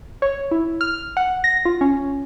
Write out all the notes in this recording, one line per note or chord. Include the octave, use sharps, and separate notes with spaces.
C#5
E4
F6
F#5
A#6
F4
C#4